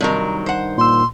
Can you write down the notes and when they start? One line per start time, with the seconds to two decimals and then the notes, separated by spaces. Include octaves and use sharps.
0.01 G2 C3 D#3 F#3 A#4
0.46 C5 F#5
0.77 A#2 C6 E6